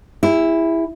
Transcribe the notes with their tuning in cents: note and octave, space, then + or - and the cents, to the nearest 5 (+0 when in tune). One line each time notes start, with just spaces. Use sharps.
E4 +0 G#4 -45